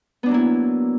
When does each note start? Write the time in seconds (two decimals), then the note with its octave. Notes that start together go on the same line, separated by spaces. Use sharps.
0.23 B3
0.26 D4
0.29 F#3
0.31 A#3
0.34 E4